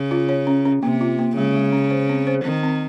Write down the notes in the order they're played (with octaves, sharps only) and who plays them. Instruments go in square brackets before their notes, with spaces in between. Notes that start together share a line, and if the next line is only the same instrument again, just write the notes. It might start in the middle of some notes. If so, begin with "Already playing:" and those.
Already playing: [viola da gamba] C#3
[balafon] F4
C#5
C#4
C#4
[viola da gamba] C3 [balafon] A#3
[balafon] F4
A#3
[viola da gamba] C#3 [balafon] G#3
[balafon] G#3
C#4
C5
C4
C5
[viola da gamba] D#3 [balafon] C4
[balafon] C4